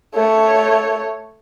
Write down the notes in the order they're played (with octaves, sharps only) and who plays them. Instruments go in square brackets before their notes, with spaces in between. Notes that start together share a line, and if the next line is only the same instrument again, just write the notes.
[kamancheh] A3 C#5